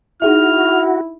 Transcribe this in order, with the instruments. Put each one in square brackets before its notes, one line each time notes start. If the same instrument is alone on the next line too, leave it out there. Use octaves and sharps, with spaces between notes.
[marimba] D#4 G#4 E5 [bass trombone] E4 [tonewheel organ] F#4 [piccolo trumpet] F6